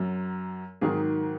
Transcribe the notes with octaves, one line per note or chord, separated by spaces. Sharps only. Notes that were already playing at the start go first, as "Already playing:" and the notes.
Already playing: F#2 F#3
G#2 D#3 F#3 G#4